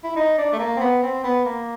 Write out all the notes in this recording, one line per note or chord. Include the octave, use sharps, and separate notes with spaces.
E4
D#4
D4
A3
A#3
C4
B3
C4
B3
A#3